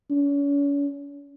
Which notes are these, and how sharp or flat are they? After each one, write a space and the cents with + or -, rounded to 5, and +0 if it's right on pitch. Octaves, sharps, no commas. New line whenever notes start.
C#4 +40